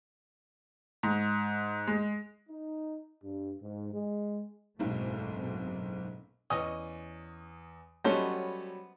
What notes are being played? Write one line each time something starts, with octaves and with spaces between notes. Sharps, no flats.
G#2
G#3
D#4
G2
G#2
G#3
F#1 B1 G#2 B2 A3 C4
E2 C#4 D#5 D#6
F#3 G3 A3 B3 C#4 C5 D#5